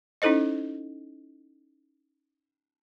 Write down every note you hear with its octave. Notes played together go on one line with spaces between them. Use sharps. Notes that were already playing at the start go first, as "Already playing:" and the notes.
C#4 D#4 E4 A4 C5 D#5